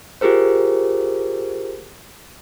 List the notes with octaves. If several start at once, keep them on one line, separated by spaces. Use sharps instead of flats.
F4 G4 G#4 A#4 C5